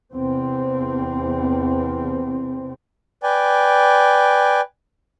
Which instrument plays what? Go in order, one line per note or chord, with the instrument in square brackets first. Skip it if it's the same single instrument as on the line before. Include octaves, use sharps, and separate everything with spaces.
[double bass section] E2 C3 C4
[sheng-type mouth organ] B4 D5 G5 G#5